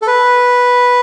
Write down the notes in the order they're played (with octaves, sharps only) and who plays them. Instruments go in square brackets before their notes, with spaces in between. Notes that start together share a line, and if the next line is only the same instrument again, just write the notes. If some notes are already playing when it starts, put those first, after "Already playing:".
[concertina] A4
B4